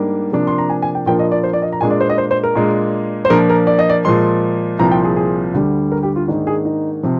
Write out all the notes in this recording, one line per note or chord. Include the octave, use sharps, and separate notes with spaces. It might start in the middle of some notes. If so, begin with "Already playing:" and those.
Already playing: G#2 G3 A#3 D4
C3 F3 A#3 D4
C6
A#5
G#5
G#5
G5
A#2 F3 A#3 D4 G5
D#5
D5
C5
D5
D#5
A#5
A#2 G#3 D4 G#5
D5
C5
D#5
C5
C5
A#4
A#2 G#3 D4
C5
A#2 F3 A#3 D4 A#4
A#4
D5
D#5
D5
A#2 F3 G#3 C6
C2 A#2 F3 C4 A#5
G5
G#4
G#4
D2 D3 G3
A#4
G4
F4
G#2 D#3 A#3 D4
G#4
D#4
C3 F3